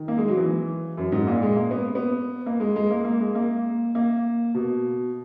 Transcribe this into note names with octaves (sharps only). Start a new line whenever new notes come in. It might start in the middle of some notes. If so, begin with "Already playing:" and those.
Already playing: D#3
A#3
G#3
F#3
E3
F#2
G#2
A#2
G#3
A#3
B3
B3
A#3
G#3
G#3
A#3
A#3
G#3
A#3
A#3
B2